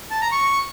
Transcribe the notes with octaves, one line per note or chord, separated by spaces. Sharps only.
A5
A#5
C#6